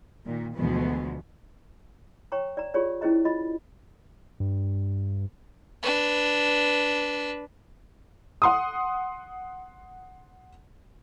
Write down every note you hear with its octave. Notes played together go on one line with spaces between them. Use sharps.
A#2 D#3
D2 B2 E3 F3 G#3 B3
C#5 G5 A#5 C#6
D5 A#5
F4 G4 G#4 C#5 D5
C#4 E4 G#4 C5 D#5 A#5
F4 D#5 B5
G2
D4 B4
F#5 C6 D#6